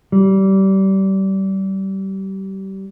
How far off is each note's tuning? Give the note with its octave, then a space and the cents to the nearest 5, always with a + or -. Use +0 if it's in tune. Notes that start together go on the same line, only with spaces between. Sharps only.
G3 -25